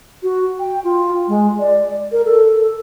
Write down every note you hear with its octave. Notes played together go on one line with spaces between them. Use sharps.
F#4
G5
F4
G#3
D5
A#4
A4